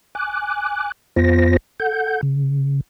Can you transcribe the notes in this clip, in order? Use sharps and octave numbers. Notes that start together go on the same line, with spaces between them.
G#5 D6 F#6
F2 B3 F4 C5 A#6
A4 F#5 G6
C#3